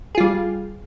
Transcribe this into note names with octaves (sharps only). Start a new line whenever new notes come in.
G3 F4 G#4